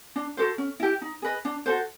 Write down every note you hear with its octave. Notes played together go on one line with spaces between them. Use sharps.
D4
F#4 A4 C5
C#4
E4 G4
D#4
G#4 B4 D#5
D4
F#4 A4 C5